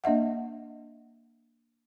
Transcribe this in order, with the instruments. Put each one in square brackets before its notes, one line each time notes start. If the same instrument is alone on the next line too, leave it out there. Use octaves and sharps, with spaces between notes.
[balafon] A#3 D4 D#5 E5 F#5